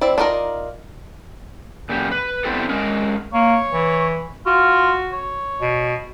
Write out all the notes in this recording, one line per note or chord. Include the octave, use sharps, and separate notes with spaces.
C4 E4 D5
D4 D#4 F4 A#4 D5
A#2 C#3 F#3 G4
B4
B3 C4 D4 E4 G4 A4
G#3 C#4 G#4 A#4
A#3 C#5
E3
F4 F#4
C#5
B2